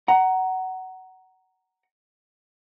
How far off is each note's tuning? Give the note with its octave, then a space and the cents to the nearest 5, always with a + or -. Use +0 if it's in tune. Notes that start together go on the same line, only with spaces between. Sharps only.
F#5 +20 A#5 +0